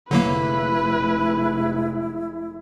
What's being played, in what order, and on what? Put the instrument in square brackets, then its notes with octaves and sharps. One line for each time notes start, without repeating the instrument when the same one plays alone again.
[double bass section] F1 G#3 [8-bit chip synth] D3 F#3 A#3 [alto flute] E4 [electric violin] B4